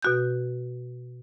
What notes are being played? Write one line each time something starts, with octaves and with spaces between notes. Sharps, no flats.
B2 F#4 G6